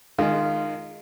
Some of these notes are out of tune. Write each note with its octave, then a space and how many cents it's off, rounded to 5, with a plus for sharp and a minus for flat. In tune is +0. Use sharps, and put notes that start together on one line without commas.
D#3 -25 G#3 +0 F4 -10